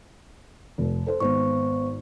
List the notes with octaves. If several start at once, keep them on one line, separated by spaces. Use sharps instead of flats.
F1
A4 C5
G#1 B3 C5 C#6